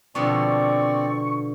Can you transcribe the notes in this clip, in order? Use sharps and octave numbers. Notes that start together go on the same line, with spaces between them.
B2 D3 F3 C4 D5 C#6